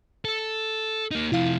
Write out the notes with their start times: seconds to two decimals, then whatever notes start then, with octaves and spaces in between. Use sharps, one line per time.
0.25 A4
1.11 A#3 D#4
1.32 C3 F3 E4 F5